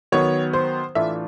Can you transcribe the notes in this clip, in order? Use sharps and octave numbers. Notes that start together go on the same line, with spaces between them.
D#3 F#3 B3 C#5
C5
A2 E3 A3 D4 F4 E5